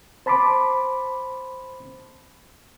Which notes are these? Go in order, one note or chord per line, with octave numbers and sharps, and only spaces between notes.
C5 A5 B5 C6 D6